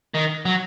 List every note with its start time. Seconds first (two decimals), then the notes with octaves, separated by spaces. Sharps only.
0.14 D#3
0.45 F#3